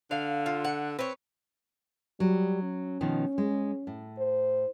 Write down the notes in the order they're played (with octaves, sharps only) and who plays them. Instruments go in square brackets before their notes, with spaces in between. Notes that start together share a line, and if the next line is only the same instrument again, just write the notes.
[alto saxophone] D3 [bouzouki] F5
[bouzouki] F4
F#5
[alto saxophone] C4 [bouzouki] B4 C#5
[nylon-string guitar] F#3 [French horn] G3
[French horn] C#4
[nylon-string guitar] B2 D#3 F3
G#3
A2
[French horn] C5